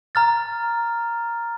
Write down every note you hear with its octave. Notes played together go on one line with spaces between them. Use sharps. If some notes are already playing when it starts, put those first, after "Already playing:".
A#5 F6 A6